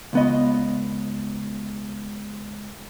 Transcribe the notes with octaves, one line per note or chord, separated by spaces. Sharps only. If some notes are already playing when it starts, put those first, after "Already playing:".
C#2 B3 D#5